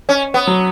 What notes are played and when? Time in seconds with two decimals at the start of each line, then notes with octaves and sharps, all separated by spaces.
0.09 C#4
0.34 B3
0.47 F#3